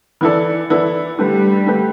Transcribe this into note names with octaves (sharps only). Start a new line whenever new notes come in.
E3 B3 E4 A4 D5
E3 B3 E4 A4 D5
D3 G3 A3 G4 B4
D3 A3 G4 B4